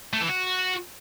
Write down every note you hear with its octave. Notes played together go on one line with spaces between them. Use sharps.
A3
E3
F#4